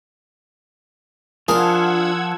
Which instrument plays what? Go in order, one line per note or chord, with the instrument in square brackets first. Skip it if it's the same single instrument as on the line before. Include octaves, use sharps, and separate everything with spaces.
[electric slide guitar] F3 [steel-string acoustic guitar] D4 F4 [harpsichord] G#4 A#4 [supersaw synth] F#5 E6 G#6